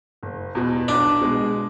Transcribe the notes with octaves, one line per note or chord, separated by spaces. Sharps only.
F#1
E2 B2
B1 D4
B2 G#3